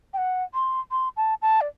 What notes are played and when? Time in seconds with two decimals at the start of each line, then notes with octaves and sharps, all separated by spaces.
0.14 G5
0.18 F#5
0.54 C6
0.91 C6
1.17 A5
1.42 A5
1.61 D5